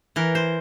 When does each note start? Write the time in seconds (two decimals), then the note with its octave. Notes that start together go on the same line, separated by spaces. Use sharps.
0.16 E3 A#4
0.35 C5